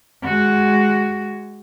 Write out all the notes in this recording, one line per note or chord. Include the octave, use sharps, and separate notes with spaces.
G#3 F#4